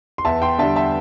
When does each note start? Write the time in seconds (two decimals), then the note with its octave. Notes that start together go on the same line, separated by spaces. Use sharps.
0.18 C6
0.25 E2 E5 A5
0.42 G5 C6
0.59 D3 G3 E5 A5
0.76 E5 A5